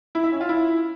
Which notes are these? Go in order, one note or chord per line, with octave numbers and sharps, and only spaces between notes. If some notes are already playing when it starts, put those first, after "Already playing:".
E4
E5
C#4
F4
E4